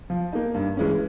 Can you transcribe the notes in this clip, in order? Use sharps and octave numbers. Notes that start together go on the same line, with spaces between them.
F3
A#3 D#4
G2
E3 G#3 C#4